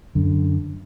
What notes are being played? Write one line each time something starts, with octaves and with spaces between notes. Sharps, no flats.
F#2 D3